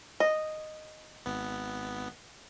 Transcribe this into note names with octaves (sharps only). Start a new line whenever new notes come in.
D#5
G#1 B3